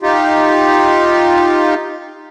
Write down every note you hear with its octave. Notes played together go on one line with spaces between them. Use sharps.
D#4 F4 G4